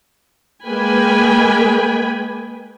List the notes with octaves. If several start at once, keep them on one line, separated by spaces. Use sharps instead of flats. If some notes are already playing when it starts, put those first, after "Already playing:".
G#3 A#3 B4 G5 G#5 B5